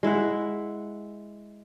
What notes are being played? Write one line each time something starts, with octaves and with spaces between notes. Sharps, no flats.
G#3 E4 E5 F#5